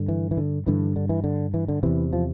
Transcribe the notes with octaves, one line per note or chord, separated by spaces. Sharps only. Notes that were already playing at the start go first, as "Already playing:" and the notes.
Already playing: G2 D3
E3
E3
D3
G2 D3 E3
D3
E3
D3
E3
D3
E2 C3 E3
F3